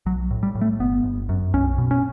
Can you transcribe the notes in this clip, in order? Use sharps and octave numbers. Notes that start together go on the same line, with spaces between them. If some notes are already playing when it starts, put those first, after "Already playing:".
B1 F#3
A2
G3
A2
A3
G1 B3
G1
F#2
B1 C#4
B2
C#4